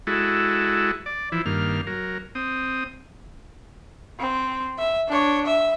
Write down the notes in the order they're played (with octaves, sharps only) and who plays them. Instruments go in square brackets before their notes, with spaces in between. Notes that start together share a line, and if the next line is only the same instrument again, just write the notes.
[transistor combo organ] G#3 E4 F#4 A4
D5
E3 F3 E4
G2 D#3 A#3 F6
F#3 A#4
C4 D#6
[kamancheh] C4
E5
D4 C#5
E5